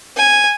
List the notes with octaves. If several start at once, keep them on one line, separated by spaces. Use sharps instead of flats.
G#5